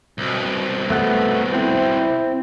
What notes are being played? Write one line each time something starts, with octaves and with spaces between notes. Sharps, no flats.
C2 B2
A3 B3
C4 E4